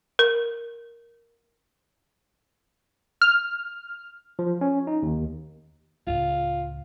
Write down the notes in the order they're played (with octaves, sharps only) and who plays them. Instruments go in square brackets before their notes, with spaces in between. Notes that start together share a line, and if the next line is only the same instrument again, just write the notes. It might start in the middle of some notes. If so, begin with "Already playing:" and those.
[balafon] A#4
[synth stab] F6
[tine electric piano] F3
C#4
D#4
D#2
[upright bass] C#2 A2 [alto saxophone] F4